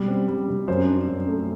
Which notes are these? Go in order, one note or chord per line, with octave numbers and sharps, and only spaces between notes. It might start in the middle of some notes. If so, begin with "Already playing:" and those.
Already playing: B2 G3
C4
G3
C3
F#2 C5
D4
F#2
A3